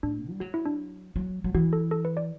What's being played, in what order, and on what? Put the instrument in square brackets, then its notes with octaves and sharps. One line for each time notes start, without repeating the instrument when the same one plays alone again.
[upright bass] A2 [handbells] D4
[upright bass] G3
[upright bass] F#3 [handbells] F#4
[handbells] E4
D4
[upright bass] F#3
F#3
[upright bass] E3 [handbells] F#4
[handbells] A4
A4
B4
D5